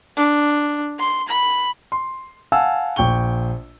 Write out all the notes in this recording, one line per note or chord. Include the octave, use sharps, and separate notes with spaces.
D4
C6
B5
C6
F5 F#5 G#5 A5 E6
A#1 G5 C#6 G7